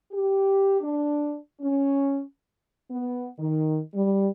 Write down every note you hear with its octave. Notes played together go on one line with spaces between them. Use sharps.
G4
D4
C#4
B3
D#3
G3